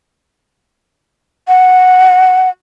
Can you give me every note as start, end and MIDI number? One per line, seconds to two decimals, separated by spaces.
1.48 2.49 78